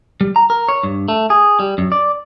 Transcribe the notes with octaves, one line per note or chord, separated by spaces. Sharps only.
G3
A#5
A#4
C#5
G2
A3
G#4
G3
F#2
D5